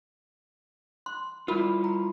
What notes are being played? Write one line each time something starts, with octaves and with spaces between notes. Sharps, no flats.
C6
G3 E4 F4 A#4 B5
A#5